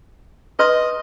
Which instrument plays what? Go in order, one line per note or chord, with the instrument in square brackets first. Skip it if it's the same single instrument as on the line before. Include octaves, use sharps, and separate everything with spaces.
[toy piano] B4 C6 D#6 [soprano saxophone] D#5